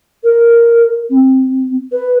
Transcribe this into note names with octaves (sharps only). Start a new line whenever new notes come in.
A#4
C4
B4